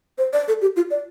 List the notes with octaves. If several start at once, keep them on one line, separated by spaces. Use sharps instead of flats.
C5
D5
A4
G4
F4
D5